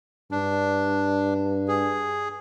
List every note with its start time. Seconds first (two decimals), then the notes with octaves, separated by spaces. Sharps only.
0.32 G2 D4
1.68 G#4